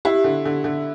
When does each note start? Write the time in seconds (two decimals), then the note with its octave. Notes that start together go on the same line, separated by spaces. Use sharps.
0.05 E4 G4
0.24 D3
0.45 D3
0.64 D3